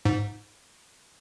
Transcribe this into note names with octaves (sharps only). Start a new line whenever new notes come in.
G#2